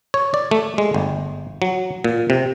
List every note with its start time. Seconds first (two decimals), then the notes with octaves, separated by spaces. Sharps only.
0.14 C#5
0.34 D5
0.51 A3
0.78 G#3
0.94 G1
1.62 F#3
2.04 A#2
2.30 C3